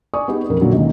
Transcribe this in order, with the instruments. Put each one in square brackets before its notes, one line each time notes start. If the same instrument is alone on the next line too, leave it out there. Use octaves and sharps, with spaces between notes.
[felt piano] D5 G#5 C#6 D#6
B3 D#4 G4 G#4
A1 F2 A#4
A#2 D3 F#3
C#2 A#2 D#3